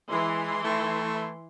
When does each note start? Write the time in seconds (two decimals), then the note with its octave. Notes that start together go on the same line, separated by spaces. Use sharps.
0.11 E3 G#3 E4 C6
0.64 A3